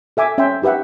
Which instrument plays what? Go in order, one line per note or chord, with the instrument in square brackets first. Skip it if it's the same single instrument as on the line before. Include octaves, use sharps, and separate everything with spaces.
[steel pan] A4 E5 G#5 D6
C#4 E5 G5 G#5 C6
D#4 G4 B4 E5 F#5